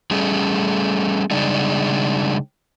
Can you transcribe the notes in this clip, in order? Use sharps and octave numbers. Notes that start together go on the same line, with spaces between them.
G3 A3 C#4 G#4
C#3 G3 G#3 D4 D#4